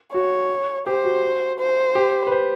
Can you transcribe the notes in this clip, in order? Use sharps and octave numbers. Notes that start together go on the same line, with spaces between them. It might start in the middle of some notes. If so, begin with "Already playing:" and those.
F#4 C#5
G4 C5
F#4
C5
G4
B4
C5